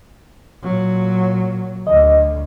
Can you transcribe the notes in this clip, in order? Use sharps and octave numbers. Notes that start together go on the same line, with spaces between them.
A#2 F#3
D2 D#5